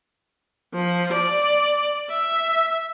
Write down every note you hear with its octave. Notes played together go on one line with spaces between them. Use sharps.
F3
D5
E5